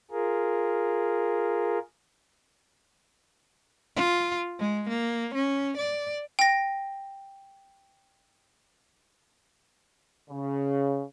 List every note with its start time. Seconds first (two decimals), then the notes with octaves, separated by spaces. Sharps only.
0.11 F4 G#4 A#4
3.96 F4
4.59 G#3
4.89 A#3
5.35 C#4
5.78 D5
6.39 G5 A#6
10.29 C#3